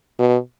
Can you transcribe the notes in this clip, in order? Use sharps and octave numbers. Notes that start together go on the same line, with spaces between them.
B2